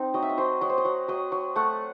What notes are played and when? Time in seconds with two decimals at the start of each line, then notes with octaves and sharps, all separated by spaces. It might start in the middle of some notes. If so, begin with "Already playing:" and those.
Already playing: C4 D#4
0.14 F#3 D#5
0.22 E5
0.29 D#5
0.38 F#3 C5
0.61 F#3 D#5
0.69 C5
0.78 D#5
0.85 F#3
1.08 F#3 D#5
1.32 F#3
1.56 A3 F#5